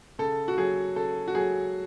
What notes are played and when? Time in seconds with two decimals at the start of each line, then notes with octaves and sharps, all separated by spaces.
0.19 C#3 A4
0.48 F#4
0.57 F#3 G#4
0.96 C#3 A4
1.28 F#4
1.35 F#3 G#4